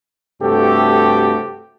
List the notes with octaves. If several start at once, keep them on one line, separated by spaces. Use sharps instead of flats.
G2 C3 A3 F#4 G4 A4